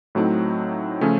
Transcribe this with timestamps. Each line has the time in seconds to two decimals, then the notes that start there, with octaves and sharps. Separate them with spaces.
0.15 A2 F#3 A3 C4 D#4
1.01 C#3 F3 A3 C#4